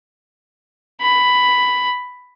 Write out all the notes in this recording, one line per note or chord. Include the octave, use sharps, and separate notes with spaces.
B5